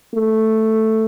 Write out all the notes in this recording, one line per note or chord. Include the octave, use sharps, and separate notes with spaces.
A3